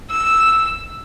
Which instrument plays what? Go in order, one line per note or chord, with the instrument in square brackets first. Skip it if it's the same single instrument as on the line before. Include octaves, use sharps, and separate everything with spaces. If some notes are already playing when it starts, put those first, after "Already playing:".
[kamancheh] E6